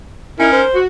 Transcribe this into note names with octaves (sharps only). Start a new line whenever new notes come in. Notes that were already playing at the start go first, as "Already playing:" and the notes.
C#4 D#4 E4 A#4
C5
F#4